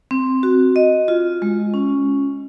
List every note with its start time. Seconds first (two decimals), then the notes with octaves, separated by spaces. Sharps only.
0.11 C4
0.43 F#4
0.76 D#5
1.08 F4
1.42 G#3
1.74 C#4